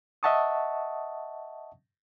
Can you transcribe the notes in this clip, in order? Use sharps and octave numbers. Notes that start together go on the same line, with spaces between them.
D#5 E5 F#5 A5 C#6 D#6